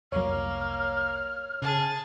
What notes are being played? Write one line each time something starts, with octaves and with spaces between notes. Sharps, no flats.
F1 C2 F#3 A#3 C#5 F6
C#3 G#4 A5